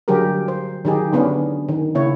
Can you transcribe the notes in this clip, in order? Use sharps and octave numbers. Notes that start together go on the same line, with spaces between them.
D3 F#3 G3 G4 G#4 A#4
C5
D#3 F#3 D#4 G4 G#4
D3 B3 C#4 D4
D#3
C#3 A#3 E4 C#5